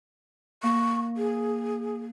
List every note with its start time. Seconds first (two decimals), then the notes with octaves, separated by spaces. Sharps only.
0.63 A#3 C#6
1.17 G#4